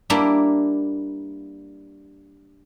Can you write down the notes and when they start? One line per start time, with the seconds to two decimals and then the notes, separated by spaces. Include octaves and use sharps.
0.10 G3 A#3 D4 E4